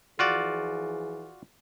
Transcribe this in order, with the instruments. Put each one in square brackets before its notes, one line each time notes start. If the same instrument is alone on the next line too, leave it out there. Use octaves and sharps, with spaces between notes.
[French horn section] E3 F3 G#4 [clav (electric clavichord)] F4 F#4 D5